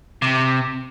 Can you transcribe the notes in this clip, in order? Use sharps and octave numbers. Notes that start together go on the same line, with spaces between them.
C3